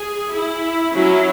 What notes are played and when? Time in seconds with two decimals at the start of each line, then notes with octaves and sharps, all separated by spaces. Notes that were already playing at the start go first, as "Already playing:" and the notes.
Already playing: G#4
0.33 E4
0.93 F#3 C#4 E4